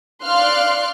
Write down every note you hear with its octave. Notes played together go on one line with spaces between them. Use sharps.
D5 F5 C6 F6 F#6